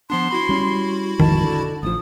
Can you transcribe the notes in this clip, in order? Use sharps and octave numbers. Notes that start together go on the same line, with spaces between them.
F3 B3 D4 C6
E4 F#4 B5
G3 C#4
A#1 F2 G#2 D#3 A5
D3
A1 F3 D#6